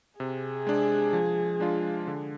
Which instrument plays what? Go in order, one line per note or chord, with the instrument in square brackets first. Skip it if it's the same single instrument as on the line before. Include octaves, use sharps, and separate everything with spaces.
[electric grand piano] C3 [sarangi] G#4
[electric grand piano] G#3 D4
F3
G#3 D4 F4
D3